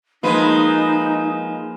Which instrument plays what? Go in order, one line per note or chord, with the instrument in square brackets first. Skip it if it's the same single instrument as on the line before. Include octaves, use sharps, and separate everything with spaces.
[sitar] F3 G#3 B4 [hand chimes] A#3 [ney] D#4